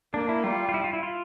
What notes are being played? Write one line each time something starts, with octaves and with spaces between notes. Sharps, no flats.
A#3 D4
E4
G3 F4
F4
E4
F4
E4
F4